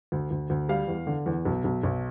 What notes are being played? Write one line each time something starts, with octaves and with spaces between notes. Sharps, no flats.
D2
D2
D2
G3 F5
E2
D3
E2
B1
B1
B1